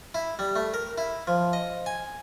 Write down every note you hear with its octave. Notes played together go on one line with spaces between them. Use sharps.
E4
G3
A3
A#4
E4
F3
D#5
G#5